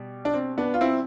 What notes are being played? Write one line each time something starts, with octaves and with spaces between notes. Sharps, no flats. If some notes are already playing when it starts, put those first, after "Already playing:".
Already playing: B2 G3
D4
C4
B3 D4
F4
C4 E4